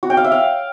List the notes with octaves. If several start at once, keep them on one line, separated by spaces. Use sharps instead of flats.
F#4
G5
F5
E5
F5